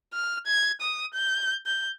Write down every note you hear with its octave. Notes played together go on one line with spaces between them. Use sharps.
F6
G#6
D#6
G6
G6